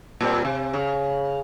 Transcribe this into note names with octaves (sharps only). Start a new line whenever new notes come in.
A#2 G3 C4
C3
C#3